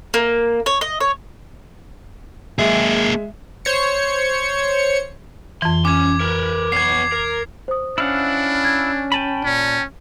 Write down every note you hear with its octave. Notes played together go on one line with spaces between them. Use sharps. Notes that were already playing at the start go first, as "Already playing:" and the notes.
A#3
C#5
D#5
C#5
G#3 A#3 G#4 E5
C5 C#5 C#7
F2 E3 C6
C#4 D6 G#6
A#4 B4
B3 C#5 G#6 C7
A#4
C5 D#6
C#4 D4 E4 F5 F#5
G#6
G5 A5 B5 D#7 F#7
A#2 C#4